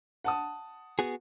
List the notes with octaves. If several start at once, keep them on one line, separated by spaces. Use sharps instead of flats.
F#5 A5 D#6
B3 F#4 G#4